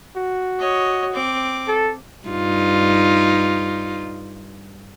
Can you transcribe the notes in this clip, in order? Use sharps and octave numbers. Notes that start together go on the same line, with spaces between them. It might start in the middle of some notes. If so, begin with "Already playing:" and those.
F#4
C#5 D#5
C4 D6
A4
G2 D#4 F4